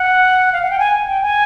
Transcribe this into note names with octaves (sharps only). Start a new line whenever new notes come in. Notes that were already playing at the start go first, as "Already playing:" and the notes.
Already playing: F#5
F5
F#5
G5
G#5
G5
G#5